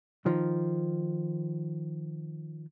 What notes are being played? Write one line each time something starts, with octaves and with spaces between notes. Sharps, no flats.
D#3 F3